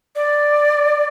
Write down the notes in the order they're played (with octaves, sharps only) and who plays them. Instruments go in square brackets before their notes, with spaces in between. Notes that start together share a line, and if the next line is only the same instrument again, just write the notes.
[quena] D5